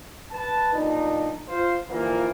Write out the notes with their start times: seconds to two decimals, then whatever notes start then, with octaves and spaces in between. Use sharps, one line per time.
0.31 B4 A5
0.73 B1 A#2 D4 D#4
1.47 F4 C5
1.89 A#2 D3 E3 F3 G3 A#3